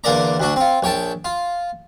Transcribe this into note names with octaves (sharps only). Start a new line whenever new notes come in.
E2 D3 A#3 A#4 D5 A#5
D2 D4 F#4
C4 F4
A#1 C#5 G5 A5
F4